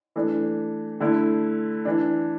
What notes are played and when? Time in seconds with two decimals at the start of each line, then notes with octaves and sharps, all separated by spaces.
0.16 E3 A3 D4
1.00 D3 A3 E4
1.85 E3 D4